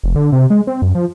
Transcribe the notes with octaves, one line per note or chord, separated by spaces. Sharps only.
F1
D3
C3
G#3
C4
F#2
F3